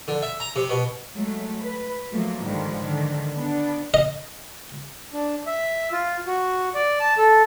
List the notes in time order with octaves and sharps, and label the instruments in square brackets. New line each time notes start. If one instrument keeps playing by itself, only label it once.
[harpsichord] D3
E5
A#5
C3
B2
[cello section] F#3 G#3 A3
B4
F3 F#3 A3 A#3
G#2 D3 D#3 F3 G3
D3 D#3
B3 D4
[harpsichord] D#5
[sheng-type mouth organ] D4
E5
F4
F#4
D5
A5
A4